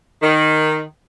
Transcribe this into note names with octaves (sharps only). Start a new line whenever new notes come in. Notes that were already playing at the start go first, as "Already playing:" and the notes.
D#3